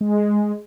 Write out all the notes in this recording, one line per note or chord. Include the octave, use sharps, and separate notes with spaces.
G#3